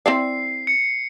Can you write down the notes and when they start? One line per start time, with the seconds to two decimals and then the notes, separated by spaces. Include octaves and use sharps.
0.06 C4 E4 D5 C7
0.67 C#7